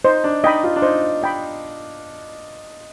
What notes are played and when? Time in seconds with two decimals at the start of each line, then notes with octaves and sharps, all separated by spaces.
0.04 D#4 C5
0.24 D4
0.44 D#4 D#5 G5 B5
0.63 F4
0.76 D4
0.82 D#4 C5
1.23 D#5 G5 B5